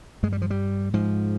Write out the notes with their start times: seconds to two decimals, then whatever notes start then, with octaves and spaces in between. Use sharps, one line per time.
0.23 G2 G#3
0.32 G3
0.42 F3
0.50 G3
0.93 G#2 F3